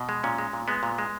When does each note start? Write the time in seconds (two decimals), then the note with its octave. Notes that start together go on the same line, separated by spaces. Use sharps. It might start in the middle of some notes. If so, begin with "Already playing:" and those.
Already playing: B2
0.09 G#3
0.24 A#2 C#4
0.38 G#3
0.53 A#2
0.68 G#3 B3
0.83 A#2
0.98 G#3